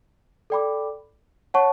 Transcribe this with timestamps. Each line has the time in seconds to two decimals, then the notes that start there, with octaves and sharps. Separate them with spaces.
0.50 A4 D5 G5 B5 D6
1.54 C#5 F#5 A5 C#6